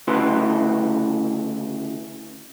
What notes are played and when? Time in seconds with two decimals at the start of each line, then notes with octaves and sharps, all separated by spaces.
0.08 D2 C#3 E4 F#4 B4 C6